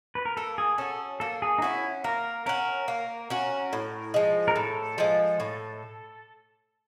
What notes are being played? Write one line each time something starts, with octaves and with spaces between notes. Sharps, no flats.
B4
A#4
A#3 A4
G#4
C#4 F#4 A4
A#3 A4
G#4
D#4
C#4 E4 F#4
A#3 A#4
C#4 F#4 A#4
A#3
C#4 F#4
A2
F3 G#3
A#4
A2 A4
F3 G#3
A2